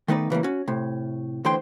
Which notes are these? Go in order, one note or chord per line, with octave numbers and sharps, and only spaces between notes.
D#3 A3 B3 D#4 B4 D5
C#3 E3 G3 A#3
C#4 F#4
A2 C3
D2 D3 E3 C5 G5 C6